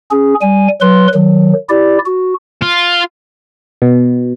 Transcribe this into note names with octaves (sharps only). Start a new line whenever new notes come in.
C#4 G#4
G3 G#5
F#3 B4 C6
D#3 F#3
E4 G4 D5
F#4
F4
B2